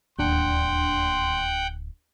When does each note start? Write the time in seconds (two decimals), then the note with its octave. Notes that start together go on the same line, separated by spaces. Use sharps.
0.19 D1 D#2 D4 F#5 G5 C6